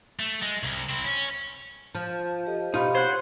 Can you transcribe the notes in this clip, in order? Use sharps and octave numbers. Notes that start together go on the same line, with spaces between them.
A3
G#3
C2
C4 E4
C#4
F3
G4 A4 D#5
B2 D#4 F4 G4 B5
C5 C#5 F#5